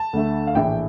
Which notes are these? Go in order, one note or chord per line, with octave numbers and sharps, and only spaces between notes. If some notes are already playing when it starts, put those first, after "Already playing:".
Already playing: A5
D2 D3 A3
F5
A#1 A2 E3 A3 G5